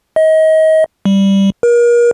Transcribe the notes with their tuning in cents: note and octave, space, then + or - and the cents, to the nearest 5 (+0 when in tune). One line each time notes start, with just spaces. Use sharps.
D#5 +30
G3 +0
A#4 +35